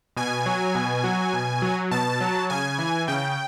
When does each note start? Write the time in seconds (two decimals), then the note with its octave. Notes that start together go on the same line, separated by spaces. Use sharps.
0.17 B2 G#5
0.46 F#3
0.75 B2
1.04 F#3
1.33 B2
1.62 F#3
1.91 B2 A5
2.21 F#3
2.50 C#3 G#5
2.79 E3
3.08 C#3 G5